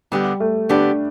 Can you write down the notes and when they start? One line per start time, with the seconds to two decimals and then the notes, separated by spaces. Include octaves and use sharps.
0.12 D3 G3 B3 G4
0.40 A3
0.69 D3 B3 D4 G4